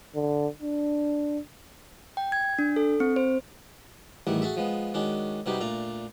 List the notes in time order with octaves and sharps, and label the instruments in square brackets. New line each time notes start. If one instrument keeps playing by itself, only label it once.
[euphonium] D3
D4
[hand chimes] G5
G#6
D4
A4
C4
C5
[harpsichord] A1 E2 D#3 G3 A3 F#5
F#4 G#4 A4 E5
F3 G#3 B3
D#3 G#3 C#4 D4 F#4
C3 G3 B3 D#4 F#4 G4
A#2 A3 D4 A#5